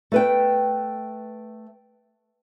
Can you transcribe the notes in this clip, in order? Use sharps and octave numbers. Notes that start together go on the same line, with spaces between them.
A3 B4 G5